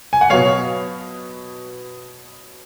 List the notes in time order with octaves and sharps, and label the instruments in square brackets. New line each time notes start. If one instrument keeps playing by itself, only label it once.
[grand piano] G#5
F#5
[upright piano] B2 F#3 B3 [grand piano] C#5 F5